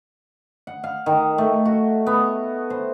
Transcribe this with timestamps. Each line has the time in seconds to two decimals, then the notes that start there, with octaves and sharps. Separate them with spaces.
0.67 F#5
0.84 F5
1.06 D#3
1.38 A3
1.65 F#4
2.06 B3
2.70 C5